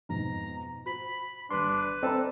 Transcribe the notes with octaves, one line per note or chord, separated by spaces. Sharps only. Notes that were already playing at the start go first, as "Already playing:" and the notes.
F2 G#2 B2 A#5
F#4 C5 B5
G1 G2 D4 B4 C6
C4 A4 D5 A#5